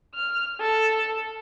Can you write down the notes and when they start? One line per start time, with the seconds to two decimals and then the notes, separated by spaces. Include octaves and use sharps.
0.14 F6
0.60 A4